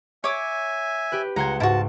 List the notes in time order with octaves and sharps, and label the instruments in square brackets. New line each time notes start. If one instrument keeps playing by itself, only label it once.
[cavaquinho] C#5 D6 [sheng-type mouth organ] E5 G#5
[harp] G4 B4
[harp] C#2 C6 G#6 [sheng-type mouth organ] F#5 [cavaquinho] A#5
[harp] G#2 [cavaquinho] E4 F#4 [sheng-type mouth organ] A5